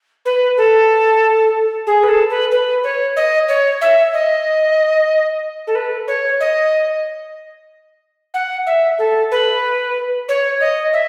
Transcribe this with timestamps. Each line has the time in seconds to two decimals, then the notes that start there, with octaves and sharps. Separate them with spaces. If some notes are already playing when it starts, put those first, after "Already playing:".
0.25 B4
0.57 A4
1.87 G#4
2.03 B4
2.08 A4
2.30 B4
2.51 B4
2.84 C#5
3.16 D#5
3.48 C#5
3.81 E5
4.13 D#5
5.67 A4
5.75 B4
6.08 C#5
6.40 D#5
8.34 F#5
8.66 E5
8.99 A4
9.31 B4
10.28 C#5
10.60 D#5
10.93 E5